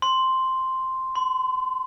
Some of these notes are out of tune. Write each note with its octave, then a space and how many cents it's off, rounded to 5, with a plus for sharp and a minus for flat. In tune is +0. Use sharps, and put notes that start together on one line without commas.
C6 +0
C6 -40